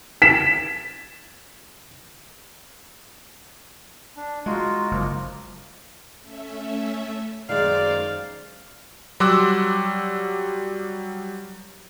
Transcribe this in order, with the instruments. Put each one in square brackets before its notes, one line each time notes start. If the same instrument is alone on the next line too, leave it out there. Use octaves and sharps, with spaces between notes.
[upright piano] B6 E7
[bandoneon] D4
[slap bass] G#3 [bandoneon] D#4 F4 F#4
[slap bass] F#1 [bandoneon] F3 A#3
[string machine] A3 C#4 E5
[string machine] F#2 C5 [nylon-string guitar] D#3 G#3 [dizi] D5 [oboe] F5
[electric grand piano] F#3 G3 C6 D6 E6 F#6